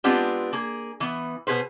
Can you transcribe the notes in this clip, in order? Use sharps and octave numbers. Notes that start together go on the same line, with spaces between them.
G#3 B3 C4 D4 F4 G4
A#3 G#4
E3 B3
B2 G#4 B4 C5